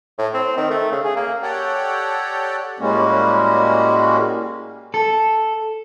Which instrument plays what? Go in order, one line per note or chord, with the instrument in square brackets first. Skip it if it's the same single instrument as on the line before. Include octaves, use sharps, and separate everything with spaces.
[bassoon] A2
C4
D#3
A3
C#3
G#4
A#3
[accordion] G4 A4 C#5 D5 F#5 G5
[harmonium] A2 G3 G#3 A#3 C#4 F#4
[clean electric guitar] A4